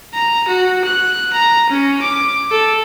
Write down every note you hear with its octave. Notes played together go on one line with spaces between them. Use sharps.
A#5
F#4
F#6
A#5
C#4
D6
A4